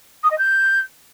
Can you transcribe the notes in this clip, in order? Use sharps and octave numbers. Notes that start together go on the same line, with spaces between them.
D#6
D#5
G6